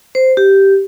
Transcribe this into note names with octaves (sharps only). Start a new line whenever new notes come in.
C5
G4